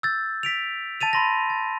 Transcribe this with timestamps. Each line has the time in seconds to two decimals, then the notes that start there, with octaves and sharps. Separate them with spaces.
0.03 E6 G6 A6
0.43 B6 D7 F7
1.01 A5 A6 D#7 F7
1.13 B5 C6 A#6
1.50 A6